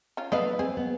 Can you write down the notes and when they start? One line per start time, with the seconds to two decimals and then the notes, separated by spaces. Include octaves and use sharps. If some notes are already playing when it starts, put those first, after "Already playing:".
0.17 C#4 F4
0.32 A3 B3 B4 D#5 F5
0.59 C4 G#4
0.77 B3